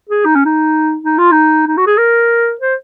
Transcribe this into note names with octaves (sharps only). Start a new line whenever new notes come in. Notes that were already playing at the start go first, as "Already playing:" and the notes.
G#4
D#4
C#4
D#4
D#4
F4
D#4
D#4
F#4
G#4
A#4
C5